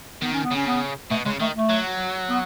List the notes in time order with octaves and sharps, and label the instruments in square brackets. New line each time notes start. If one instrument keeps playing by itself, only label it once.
[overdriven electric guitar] D#3 [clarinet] B3
[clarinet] C#4
B3
[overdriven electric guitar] C#3 [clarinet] C#4
[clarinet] B3
[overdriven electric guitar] B2 [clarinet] A3
[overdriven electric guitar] C#3 [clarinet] G#3
[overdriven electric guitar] D#3 [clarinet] A3
[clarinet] A3
[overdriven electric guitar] F#3
[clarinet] B3